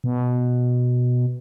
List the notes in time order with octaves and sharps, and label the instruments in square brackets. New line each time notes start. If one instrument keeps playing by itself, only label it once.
[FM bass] B2